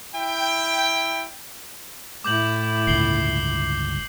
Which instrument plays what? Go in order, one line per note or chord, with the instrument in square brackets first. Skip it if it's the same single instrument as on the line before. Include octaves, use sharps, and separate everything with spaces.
[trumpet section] E4 G5
[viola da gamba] A2 E4 [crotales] D6 G6 F#7
[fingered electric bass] G1 C#2 [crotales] C7 F#7 G7